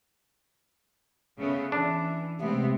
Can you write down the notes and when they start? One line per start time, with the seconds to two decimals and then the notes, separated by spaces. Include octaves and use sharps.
1.38 C#3 A3 B3
1.72 E3 D4
2.41 C3 G#3 A3 B3 C4